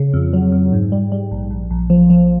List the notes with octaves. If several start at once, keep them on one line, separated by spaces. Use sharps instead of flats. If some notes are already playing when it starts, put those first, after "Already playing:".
Already playing: C#3
F2
F#3
F2
G#2
G3
G3
A#1
A#1
A#1
F3
F3